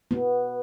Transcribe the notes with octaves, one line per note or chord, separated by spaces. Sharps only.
B3